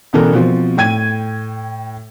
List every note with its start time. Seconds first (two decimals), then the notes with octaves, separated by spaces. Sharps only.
0.13 E1 C#3 E3 B3 A4 A#4
0.33 B2 F3 C4
0.77 A2 G5 G#6 D#7